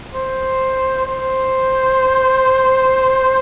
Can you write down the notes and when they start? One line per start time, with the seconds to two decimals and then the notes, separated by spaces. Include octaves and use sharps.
0.15 C5
1.06 C5